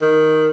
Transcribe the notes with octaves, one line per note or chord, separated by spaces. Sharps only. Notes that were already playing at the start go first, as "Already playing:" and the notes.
D#3